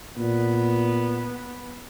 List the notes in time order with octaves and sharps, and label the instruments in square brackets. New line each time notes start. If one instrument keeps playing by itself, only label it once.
[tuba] A#2 [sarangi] B3